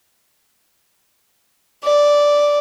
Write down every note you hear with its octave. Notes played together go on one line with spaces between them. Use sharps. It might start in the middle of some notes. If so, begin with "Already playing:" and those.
D5